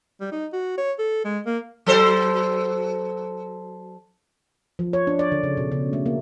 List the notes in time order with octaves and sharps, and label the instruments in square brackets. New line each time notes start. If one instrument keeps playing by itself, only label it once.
[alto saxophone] G3
D#4
F#4
C#5
A4
G#3
A#3
[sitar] F#3 A4 C5
[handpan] F3
C#5
D4
D5
D3
C#3
B2
C#3
A3
A#3